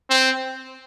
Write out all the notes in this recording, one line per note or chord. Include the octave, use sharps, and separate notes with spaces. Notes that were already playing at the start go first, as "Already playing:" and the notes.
C4